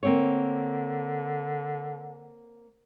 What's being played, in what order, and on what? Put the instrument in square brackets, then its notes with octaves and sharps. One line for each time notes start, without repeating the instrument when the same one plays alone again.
[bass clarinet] D3 [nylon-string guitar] A#3 C4 C#5